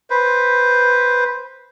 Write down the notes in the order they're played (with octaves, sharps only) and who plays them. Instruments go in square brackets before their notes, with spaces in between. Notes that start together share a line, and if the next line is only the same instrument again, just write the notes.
[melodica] B4 C5